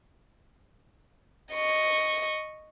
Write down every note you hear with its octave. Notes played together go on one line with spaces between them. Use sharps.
D#5 C#6